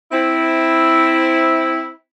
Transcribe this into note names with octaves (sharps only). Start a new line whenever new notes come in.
C4 E4